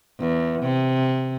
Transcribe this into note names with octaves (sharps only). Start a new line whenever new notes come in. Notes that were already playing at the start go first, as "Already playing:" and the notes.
E2
C3